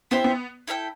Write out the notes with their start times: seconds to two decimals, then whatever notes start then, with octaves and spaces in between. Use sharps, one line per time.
0.11 B3 E4 G4 C5 E5
0.24 B3
0.67 E4 A4 E5 G5